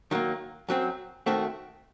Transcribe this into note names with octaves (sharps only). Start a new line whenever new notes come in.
D#3 F#3 A#3
F#2 F#3 C4
D#3 A3 C4 F#4